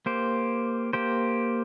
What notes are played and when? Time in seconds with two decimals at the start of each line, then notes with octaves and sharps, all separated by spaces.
0.06 A#3 G4 C5
0.93 A#3 G4 C5